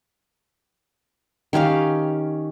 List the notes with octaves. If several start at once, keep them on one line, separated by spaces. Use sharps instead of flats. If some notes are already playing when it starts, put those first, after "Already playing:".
D#3 C#4 G4 F5